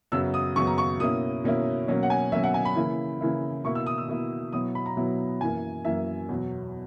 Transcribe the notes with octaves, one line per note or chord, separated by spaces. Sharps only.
F#2 C#3 F#3 B3 E6
D#6
F#2 C#3 F#3 B3 C#6
A#5
C#6
B2 A#3 C#4 E4 D#6
B2 A#3 C#4 E4
B2 F#3 A#3 C#4
F#5
G#5
B2 F#3 A#3 C#4 E5
F#5
G#5
B5
C#3 E3 A#3 E4
C#3 E3 A#3 E4
B2 A#3 E4 C#6
E6
D#6
E6
B2 A#3 E4
B2 F#3 B3 E4 D#6
B5
A#5
B2 F#3 B3 E4
F#2 E3 A#3 G#5
F#2 E3 A#3 E5
E2 B2 F#3